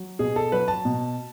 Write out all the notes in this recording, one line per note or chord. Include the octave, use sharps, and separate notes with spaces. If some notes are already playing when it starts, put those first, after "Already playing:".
Already playing: F#3
B2 G#4
A4
F#3 B4
A5
B2